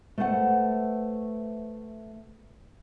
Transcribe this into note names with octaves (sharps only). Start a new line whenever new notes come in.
A3 B4 C5 F5 F#5